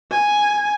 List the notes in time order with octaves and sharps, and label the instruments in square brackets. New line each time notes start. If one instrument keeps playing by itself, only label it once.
[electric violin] G#5